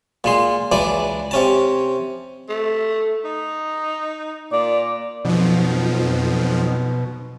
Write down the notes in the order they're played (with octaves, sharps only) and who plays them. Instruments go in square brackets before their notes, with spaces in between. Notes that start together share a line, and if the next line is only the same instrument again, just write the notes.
[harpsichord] A#2 G#3 C6
C#2 E3 D4 D5
C3 C#4 A5
[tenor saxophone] A3
D#4
[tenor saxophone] A#2 [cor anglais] D5
[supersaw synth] F2 F3 [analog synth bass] B2 [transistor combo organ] F#3 C4 D#4